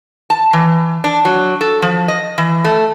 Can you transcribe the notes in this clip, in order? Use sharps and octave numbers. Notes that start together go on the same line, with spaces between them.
A5
E3
D4
F#3
A4
F3
D#5
E3
A3